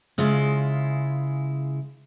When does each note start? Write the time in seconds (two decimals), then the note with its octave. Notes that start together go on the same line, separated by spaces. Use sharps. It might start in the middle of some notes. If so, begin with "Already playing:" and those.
0.18 C#3 G#3 E4 F4